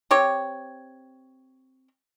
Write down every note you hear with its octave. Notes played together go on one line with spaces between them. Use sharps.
C4 G4 C#5